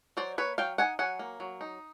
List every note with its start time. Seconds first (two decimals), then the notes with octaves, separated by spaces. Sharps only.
0.17 F#3 C5 D5
0.38 A#3 B4 C#5
0.58 F#3 F5 G5
0.78 D#4 F#5 G#5
0.99 F#3 F#5 G#5
1.19 A#3
1.40 F#3
1.61 D#4